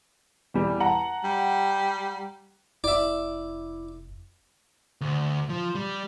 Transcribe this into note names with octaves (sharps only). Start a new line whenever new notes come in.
E2 G3
F#5 A5 A#5
G3
F1 E4 D5 E5
D2
F3
G3